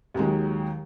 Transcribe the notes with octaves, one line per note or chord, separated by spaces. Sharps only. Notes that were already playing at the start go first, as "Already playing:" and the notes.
D#2 D#3 F#3 G#3